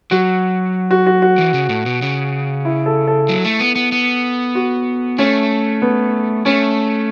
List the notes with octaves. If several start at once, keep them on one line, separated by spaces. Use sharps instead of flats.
F#3 F#4
F#4
F#4
F#4
E3
C#3
A2
B2
C#3
E4
A4
A4
F#3
A3
B3
B3
B3
F#4
A3 C#4
B3
A3 C#4